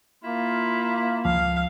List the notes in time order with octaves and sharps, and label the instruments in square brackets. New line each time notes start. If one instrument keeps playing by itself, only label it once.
[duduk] A#3 [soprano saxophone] E4 [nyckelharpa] F4
[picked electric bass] C#2 F3 [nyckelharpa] F5